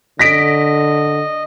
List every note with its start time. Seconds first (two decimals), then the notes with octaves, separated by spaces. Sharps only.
0.19 D3 D#5 A#6 B6 D7